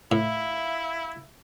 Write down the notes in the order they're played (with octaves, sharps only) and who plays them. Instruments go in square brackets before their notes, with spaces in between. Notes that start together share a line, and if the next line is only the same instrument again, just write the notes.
[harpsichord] A2 [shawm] E4 [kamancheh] E5 F5